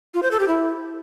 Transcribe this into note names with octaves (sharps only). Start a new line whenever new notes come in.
F4
C5
A4
G4
E4